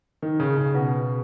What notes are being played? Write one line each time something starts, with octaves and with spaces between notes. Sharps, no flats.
D#3
C#3
C#3
B2